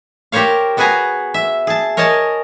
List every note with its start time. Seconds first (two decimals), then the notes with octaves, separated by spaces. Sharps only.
0.32 G4 A#4 C5 C#5 F5
0.77 B3 F#4 G#4 B4 G#5 A#5
1.34 E5
1.67 G#4 A5
1.97 A#4 C#5 D#5 G#5 A5